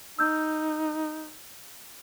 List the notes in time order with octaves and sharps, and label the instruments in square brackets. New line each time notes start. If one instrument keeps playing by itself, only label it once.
[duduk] D#4 [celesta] E6 G6